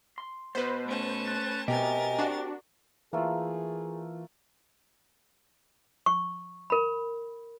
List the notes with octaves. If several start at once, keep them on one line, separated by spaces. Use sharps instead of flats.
C6
B2 B3 B4 C5
A3 C#4 A5
F#6 A6
B2 C4 G4 A#4 D#5 G#5 A6
D4 F#4
E3 A3 A#3 F4 G#4
C#6
A#4 B5